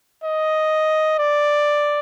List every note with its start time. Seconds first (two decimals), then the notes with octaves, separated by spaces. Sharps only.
0.24 D#5
1.19 D5